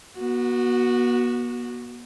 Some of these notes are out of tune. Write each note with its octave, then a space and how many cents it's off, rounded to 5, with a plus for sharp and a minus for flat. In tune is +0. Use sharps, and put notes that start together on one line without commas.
B3 -40 F#4 +0